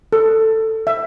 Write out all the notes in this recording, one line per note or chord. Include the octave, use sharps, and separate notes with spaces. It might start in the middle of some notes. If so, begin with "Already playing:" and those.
A4
E5